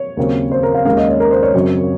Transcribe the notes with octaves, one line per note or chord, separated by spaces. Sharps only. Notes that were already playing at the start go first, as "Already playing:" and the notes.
Already playing: C#5
D#2 C#3 F#3 C4
C5
A#4
F5
D#2 D#3 G#3 C#4 F5
D#5
C#5
A#4
C5
C#5
F#2 C#3 F#3 C4